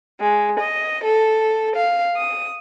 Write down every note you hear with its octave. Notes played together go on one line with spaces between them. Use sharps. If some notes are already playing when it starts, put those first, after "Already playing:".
G#3
D#5
A4
F5
D#6